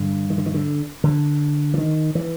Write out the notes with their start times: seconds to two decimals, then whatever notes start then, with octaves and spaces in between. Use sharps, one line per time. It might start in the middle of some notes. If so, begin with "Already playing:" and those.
Already playing: G2 D3
0.30 D#3
0.38 D3
0.46 D#3
0.54 D3
1.04 D3
1.74 E3
1.78 D#3
2.15 E3